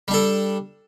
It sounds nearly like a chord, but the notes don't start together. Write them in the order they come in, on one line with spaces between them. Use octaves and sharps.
G3 D4 A4